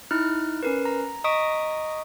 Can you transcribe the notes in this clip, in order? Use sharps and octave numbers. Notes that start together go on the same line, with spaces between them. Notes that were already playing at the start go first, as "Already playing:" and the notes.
D#4 E4 F6 F#6
C#4 A#4 B4
A#5
D#5 A#5 C#6 D#6 B6 D7